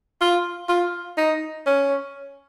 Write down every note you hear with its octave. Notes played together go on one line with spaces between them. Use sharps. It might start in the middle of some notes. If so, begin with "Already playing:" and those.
F4
F4
D#4
C#4